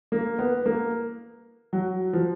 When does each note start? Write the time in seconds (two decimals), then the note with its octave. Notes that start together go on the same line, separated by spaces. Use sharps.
0.12 A#3
0.39 B3
0.66 A#3
1.73 F#3
2.13 F3